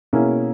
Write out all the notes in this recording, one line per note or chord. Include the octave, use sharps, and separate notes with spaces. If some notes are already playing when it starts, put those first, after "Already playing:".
B2 A#3 C#4 E4 G#4